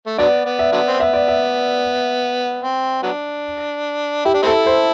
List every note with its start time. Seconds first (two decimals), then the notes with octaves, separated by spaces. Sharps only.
0.06 A3
0.18 D3 F#3 B3 D5
0.45 B3
0.59 E5
0.72 D3 F#3 B3
0.88 C4
1.00 B3 E5
1.13 D5
1.28 E5
2.62 C4
3.03 F#3 B3 D4
4.25 E4 G4
4.34 D4
4.43 A3 C4 E4 A4
4.66 C5